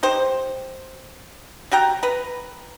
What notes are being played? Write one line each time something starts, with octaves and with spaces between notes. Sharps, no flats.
D#4 G4 C5
G3 F#4 G5 A#5
B4 A#5